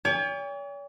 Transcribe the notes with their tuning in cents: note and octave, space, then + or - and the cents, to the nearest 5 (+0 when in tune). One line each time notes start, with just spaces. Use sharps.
C#5 +45 G5 +45